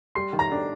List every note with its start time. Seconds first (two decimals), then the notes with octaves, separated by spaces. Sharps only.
0.15 G3 C6 C7
0.33 D#3
0.39 A#5 A#6
0.52 D4